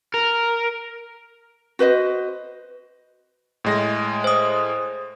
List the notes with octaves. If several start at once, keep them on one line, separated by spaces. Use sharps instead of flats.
A#4
F#4 B4 C5 D#5
A2 G#3 A#6
C5 D#6